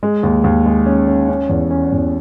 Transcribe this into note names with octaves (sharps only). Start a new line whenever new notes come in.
G#3
D#2
D#2
G#3
C#4
C#4
C#4
E2
C#4
E2